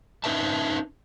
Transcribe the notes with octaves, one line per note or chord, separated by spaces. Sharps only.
C#4 D#4 B4 E5 A5